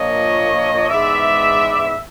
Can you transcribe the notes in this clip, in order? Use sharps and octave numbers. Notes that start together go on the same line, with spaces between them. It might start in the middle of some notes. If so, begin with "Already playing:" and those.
Already playing: A#2 F3 A#3 D4 C#5 D#5
G#2 E3 G#3 B3 D5 E5